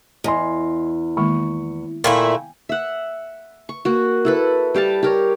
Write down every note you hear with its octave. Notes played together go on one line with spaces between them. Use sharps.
E2 D#5 G#5 C6
D#3 G#3 A#3 C#6
A#2 A3 E4 G5 G#5
E5 F#5
C#6
A#3 F#4
E4 A4 B4
G3 G4 F5 A5
G4 A#4 C#5